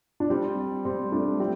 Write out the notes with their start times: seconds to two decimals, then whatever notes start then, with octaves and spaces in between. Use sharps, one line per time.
0.20 D4
0.30 G3 C4
0.85 G3 C4
1.12 A3 D4
1.39 G3 C4